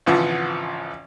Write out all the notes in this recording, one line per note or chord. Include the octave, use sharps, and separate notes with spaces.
G#1 C#3 E3 F3 F#5